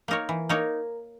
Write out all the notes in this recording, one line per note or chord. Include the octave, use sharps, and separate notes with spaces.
A#3 D#4 A#4 C#5
E3
A#3 D#4 A#4 C#5